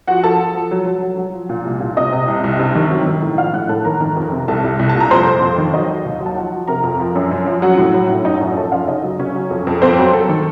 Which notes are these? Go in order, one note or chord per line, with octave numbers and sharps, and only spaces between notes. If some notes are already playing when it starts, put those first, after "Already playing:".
F3 F#4 F#5
F3 A4 A5
F3
F3
F#3
F#3
F#3
F#3
F3
A#2
C2
A#2
C3 D#5 D#6
C3
C2
C2
C3
D#3
F#3
D#3
A2
F3 F5 F6
A2 F#5 F#6
A2 A4 A5
D#3 A#4 A#5
D#3
F2
C3
C2 A4 A5
C2
C2
A5
A#2
A#5
F2 C5 C6
F2
F2
D#3
F#3 D#4 D#5
F#3
D#2
F#3
A5
F3 F#4 F#5
F3
C3 A#4 A#5
F2
F3
F#2
F#2
F3
F#3 F#4 F#5
A2
F#3
A2
F#2 D#4 D#5
F#2 F#4 F#5
F3 A4 A5
F#2 F4 F5
C#3 D#4 D#5
F#3
C#3 C#4 C#5
F#3
F2
F2
F2 C4 C5
F#3
F#3 A4
D#3